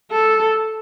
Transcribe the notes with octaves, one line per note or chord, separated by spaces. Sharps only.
A4